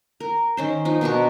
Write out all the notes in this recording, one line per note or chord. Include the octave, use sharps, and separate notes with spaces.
A#4
D#3 C#4 C5
F3 D#4
B2 D4 A#4 C#6